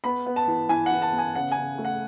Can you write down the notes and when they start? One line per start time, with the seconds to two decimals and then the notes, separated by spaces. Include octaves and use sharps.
0.04 B3 B5
0.26 B3
0.36 A5
0.48 E3
0.69 E3 G#5
0.86 F#5
0.92 E3
1.02 A5
1.13 B3
1.18 G#5
1.35 C#3 F#5
1.52 G#5
1.57 C#3
1.78 A3
1.85 F#5